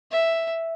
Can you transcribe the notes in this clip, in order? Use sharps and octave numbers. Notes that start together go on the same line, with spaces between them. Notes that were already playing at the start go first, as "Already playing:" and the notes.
E5